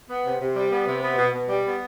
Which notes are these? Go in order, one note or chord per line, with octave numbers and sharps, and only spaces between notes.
B3
C3
C3
G3
B3
C3
B3
B2
B2
G3
B3